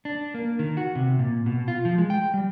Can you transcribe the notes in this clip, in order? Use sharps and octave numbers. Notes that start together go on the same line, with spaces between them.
D4
A#3
D#3
F#4
C3
A#2
B2
F4
F3
G#3
G5
G3